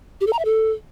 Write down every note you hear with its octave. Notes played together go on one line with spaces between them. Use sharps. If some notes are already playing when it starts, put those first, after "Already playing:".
G4
A4
A#5
E5
A4